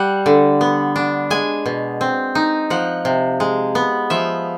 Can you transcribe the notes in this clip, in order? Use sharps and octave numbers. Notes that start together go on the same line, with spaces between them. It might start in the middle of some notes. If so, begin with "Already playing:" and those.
Already playing: G3 F#5
D3
B3
D4
G#3 G#5
B2
C4
D#4
F3 F#5
C3
G#3
B3
F3 E5